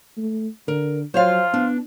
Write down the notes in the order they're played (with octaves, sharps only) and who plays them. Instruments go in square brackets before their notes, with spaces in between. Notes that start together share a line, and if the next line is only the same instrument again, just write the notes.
[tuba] A3
[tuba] D3 [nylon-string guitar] A#4
[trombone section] F3 F4 [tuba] F#3 [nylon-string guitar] C5 C#5 F5
[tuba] B3 [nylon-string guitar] D4